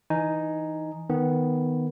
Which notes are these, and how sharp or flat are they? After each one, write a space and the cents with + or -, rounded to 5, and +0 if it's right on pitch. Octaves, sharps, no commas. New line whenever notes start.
E3 -15 D#4 +0 G#5 +10
D#3 +0 B3 +0